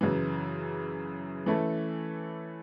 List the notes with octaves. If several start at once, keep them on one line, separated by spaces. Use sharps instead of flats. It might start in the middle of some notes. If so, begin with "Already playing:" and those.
F#2 C#3 E3
E3 A3 C#4 E4 A4